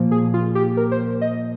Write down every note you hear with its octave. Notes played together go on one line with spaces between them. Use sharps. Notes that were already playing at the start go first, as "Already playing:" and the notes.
Already playing: A#2 F3 A#3
G#4
F4
G4
A#4
C5
D#5